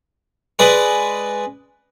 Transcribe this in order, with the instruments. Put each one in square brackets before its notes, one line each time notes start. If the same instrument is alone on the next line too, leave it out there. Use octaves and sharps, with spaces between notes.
[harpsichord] G#3 G#4 B4 D5